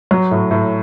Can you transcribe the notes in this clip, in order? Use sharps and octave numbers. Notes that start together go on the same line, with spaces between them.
F#3
A2
A2